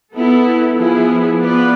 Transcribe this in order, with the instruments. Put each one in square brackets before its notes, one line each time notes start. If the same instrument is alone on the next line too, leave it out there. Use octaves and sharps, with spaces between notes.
[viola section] B3 E4 A4
F3 B3 E4 G#4
B3 F4 B4 D5